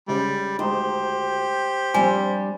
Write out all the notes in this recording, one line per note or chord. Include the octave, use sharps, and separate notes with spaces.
C#3 G3 G#3
D2 G#3 D#4 G4 C5
F3 G3 C4 D4 G#5